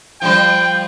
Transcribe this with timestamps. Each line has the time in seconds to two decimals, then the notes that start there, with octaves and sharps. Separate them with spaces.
0.22 F3 G3 C5 G5